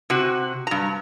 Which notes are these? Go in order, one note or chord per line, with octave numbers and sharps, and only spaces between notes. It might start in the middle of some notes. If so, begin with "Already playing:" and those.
C3 F#4
G2 A#5